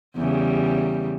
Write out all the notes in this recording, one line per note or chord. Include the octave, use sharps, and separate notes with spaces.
E2 C#3 G3